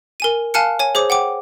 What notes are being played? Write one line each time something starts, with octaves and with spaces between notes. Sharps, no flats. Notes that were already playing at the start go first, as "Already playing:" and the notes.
A#4 G#5 D#7
F5 G#5 A5 F6 F#6 C#7
C#5 G#5
G#4 C5 C#5 D6
F#5 G5 D6